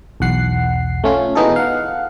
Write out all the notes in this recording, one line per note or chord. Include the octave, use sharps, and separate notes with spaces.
B1 E2 F#5 C7
A3 C#4 F4
B2 E3 B3 D#4 G#4 A4
F5 F#5